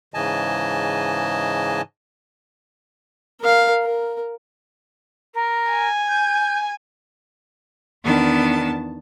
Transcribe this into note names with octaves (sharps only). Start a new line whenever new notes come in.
G#2 C#3 E3 D#5 G#5 A5
A#4 F5
A#4
A#4
G#5
G6
E2 D#3 B3 D4 A5